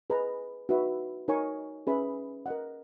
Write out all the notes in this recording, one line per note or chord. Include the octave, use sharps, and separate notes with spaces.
G#4 B4 D#5 A#5
D#4 F#4 B4 E5
D#4 A#4 C#5 G#5 C#6
C#4 G#4 B4 E5 B5
A#4 D#5 F#5